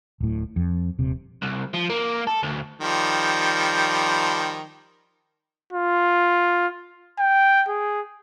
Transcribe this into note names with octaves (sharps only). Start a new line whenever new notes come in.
D1 A2
F2
D#1 C3
C2
F3
A#3
A4
D2
D#3 F3 G3
F4
G5
G#4